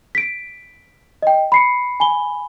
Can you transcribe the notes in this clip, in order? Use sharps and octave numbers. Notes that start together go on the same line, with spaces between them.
B6 D7
D#5 G5
B5 C7 C#7
G#5 B5 G7